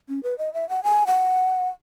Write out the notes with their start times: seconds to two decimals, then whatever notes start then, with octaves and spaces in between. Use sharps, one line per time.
0.09 C#4
0.23 B4
0.38 D#5
0.54 E5
0.69 F#5
0.83 G#5
1.07 F#5